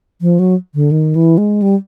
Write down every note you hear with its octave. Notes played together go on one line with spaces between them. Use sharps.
F3
F#3
D3
D#3
E3
G#3
G3